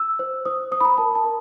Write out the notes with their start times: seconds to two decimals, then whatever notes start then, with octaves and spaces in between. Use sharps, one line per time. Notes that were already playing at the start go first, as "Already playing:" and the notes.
Already playing: E6
0.19 C5
0.45 C5 D#6
0.71 C5 D#6
0.80 B5
0.85 A#5
0.98 A#4 A5
1.15 A5
1.24 A#4